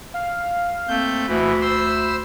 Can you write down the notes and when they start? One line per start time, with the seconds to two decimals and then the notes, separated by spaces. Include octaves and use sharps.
0.14 F5
0.88 A3 A#3 C4 G6
1.27 D2 B2 E3 B5
1.61 C5 C6 E6